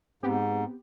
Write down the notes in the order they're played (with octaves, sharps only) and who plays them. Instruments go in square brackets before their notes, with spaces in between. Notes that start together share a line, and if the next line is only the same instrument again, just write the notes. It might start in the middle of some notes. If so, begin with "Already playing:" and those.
[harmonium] G#2 [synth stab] B3 C4 G4